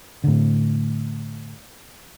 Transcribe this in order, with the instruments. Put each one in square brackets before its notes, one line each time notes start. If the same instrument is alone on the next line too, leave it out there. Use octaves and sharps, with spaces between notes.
[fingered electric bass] A2 D3